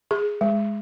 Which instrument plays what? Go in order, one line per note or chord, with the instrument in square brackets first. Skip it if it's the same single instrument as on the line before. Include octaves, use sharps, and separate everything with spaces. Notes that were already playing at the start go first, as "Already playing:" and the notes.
[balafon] G#4
G#3